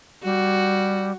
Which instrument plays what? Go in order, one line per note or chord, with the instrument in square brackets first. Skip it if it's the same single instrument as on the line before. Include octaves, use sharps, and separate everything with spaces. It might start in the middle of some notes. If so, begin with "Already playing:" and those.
[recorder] G3 [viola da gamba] F#4